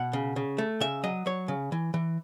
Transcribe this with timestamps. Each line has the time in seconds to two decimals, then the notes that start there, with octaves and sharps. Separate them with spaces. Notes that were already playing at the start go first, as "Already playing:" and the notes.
Already playing: B2 F#5
0.13 C#3
0.36 C#3
0.58 A3
0.80 C#3 E5
1.04 F#3 D#5
1.26 F#3 C#5
1.48 C#3
1.72 E3
1.94 E3